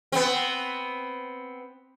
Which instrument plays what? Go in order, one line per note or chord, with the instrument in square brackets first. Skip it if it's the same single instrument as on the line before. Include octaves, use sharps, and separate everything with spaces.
[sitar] B3 C4